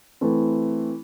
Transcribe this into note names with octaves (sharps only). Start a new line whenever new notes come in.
E3 A3 C4